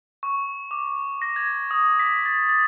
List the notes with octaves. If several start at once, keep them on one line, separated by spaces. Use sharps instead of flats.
C#6
D6
A#6
G#6
D#6
B6
A6
A6